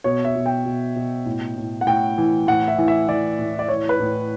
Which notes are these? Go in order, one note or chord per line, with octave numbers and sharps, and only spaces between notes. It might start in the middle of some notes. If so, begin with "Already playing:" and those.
B2 C#5
E5
B2
G5
B2
B2
A2
A2
F#5
A2 G5
E3
A2 F#5
E5
E3
E5
E3 D5
A2
D5
E3 C#5
B4
A2